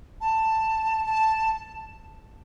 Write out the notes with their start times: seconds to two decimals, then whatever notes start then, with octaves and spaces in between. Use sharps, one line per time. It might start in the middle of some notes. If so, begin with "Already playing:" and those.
0.21 A5
1.06 A5